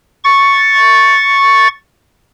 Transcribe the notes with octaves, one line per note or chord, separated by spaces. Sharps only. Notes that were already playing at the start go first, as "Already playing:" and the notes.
C#6 A6